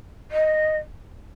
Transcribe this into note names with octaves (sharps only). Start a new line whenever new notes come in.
D#5